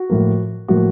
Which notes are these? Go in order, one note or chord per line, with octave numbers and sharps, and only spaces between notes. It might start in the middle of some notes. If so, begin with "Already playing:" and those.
Already playing: F#4
A2 F3 A#3
A2 F3 A#3 F#4